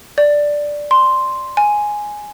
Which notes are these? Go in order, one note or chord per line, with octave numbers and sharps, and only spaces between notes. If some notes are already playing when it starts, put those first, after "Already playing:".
D5
C6
G#5